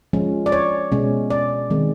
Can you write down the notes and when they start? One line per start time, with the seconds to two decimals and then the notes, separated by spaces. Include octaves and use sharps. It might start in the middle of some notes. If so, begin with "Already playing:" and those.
0.13 F3 G#3 C#4
0.46 D5
0.52 C#5
0.92 B2 G#3 C#4
1.30 D5
1.70 D#3 G#3 C4